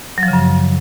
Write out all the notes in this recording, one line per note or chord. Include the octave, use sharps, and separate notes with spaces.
F#3
F3
C#3
F#2